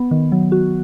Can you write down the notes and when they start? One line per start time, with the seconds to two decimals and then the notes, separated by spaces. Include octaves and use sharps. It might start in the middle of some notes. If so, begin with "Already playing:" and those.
Already playing: B3
0.11 D#3
0.32 F#3
0.52 F#4